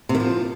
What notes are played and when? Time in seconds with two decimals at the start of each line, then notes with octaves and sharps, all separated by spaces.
0.09 C3
0.15 D#3
0.20 F3